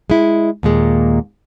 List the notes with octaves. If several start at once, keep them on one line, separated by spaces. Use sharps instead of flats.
G#3 E4
D#2 A#2 G#3